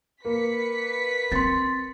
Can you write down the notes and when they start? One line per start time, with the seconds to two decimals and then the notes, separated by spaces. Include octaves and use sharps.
0.25 A#3 B4 B6 C#7
1.32 C4 C6 A6